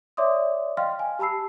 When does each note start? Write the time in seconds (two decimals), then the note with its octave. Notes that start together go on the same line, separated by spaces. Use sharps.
0.17 C#5 D5 E5 C6 D6 D#6
0.77 D#5 F5 G5 C6 F6
0.99 G#5
1.19 G4 A5 B5 E6 C7